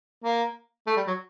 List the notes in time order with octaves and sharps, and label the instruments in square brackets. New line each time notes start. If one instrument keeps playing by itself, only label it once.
[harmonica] A#3
A3
G3
F#3